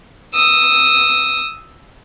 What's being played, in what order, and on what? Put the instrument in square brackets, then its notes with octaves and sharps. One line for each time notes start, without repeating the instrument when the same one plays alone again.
[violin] D#6 E6